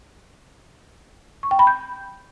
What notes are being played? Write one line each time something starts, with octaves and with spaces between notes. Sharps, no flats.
C#6
G5
B5
G6